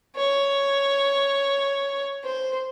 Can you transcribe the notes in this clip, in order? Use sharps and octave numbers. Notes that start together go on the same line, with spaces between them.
C#5
C5